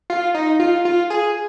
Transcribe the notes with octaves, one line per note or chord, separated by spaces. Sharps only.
F4
D#4
F4
F4
G#4